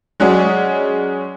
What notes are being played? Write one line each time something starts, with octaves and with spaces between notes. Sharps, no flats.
F#3 G#3 C#4 F#4 G#4 D5